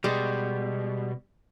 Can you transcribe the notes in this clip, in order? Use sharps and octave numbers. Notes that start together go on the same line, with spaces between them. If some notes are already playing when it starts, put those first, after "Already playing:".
B2 G3 G#3